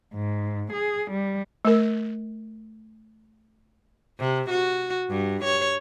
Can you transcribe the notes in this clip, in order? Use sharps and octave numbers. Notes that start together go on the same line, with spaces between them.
G#2
G#4
G3
A3 A#4
C3
F#4
G2
C#5